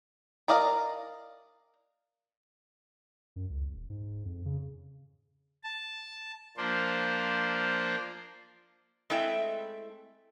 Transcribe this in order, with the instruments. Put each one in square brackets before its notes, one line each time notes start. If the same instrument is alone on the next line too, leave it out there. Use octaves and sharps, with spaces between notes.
[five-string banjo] A#4 D5 D#5 F5 A#5
[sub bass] F#2
C#2
D#1
G#2
F2
C#3
[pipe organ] A5
F3 A#3 D4 C5
[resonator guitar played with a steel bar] G#3 A3 C4 E4 E5 G5